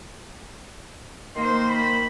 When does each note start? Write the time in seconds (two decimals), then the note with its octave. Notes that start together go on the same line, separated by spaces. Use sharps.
1.35 D#3 A#3 C5 C6
1.69 B5